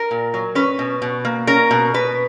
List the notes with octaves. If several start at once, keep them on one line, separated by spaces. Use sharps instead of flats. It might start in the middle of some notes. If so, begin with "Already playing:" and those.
Already playing: A#4
A#2
F#3
C#4 B4
B2
B2
A#3
C#4 A#4
B2
B2 B4